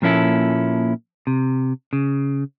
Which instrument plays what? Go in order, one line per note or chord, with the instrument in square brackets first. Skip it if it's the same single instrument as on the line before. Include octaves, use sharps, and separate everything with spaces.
[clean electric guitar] A#2 F3 A#3 C#4 E4 A4
C3
C#3